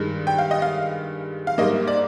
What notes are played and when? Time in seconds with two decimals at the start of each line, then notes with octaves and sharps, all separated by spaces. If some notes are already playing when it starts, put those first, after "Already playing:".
Already playing: G2 D#3 G#3
0.27 G5
0.38 F5
0.51 D#5
0.62 F5
1.47 F5
1.58 G#2 G3 A#3 D#5
1.88 D5